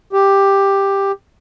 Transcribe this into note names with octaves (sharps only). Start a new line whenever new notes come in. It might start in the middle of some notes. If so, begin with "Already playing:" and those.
G4